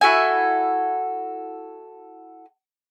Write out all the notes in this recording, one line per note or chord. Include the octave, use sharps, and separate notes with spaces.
E4 F#4 A4 G#5